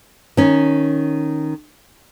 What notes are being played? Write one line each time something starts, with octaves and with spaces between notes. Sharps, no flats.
D#3 C#4